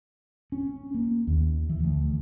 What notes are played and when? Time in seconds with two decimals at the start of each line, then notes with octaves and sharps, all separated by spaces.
0.52 C#4
0.94 A#3
1.27 D#2
1.69 E3
1.84 D2